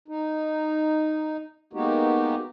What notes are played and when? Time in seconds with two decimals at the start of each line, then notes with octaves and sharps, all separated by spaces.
0.08 D#4
1.73 G#3 A#3 B3 D#4 F#4 G4